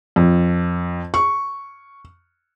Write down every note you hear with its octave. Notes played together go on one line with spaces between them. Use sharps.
F2
C#6